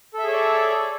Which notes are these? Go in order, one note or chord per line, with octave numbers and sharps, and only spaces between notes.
G#4 A4 C#5 D5 E5